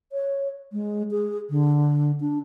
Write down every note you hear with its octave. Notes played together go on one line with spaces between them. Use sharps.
C#5
G#3
G#4
D3
D4